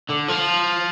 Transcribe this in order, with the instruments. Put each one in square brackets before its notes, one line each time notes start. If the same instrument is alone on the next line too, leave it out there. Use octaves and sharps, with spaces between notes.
[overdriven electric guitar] D3
F3